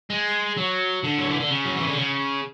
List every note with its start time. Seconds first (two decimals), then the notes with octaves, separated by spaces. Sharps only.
0.10 G#3
0.57 F#3
1.04 D3
1.19 F#3
1.29 E3
1.40 D3
1.51 C#3
1.65 F#3
1.76 E3
1.87 D3
1.98 C#3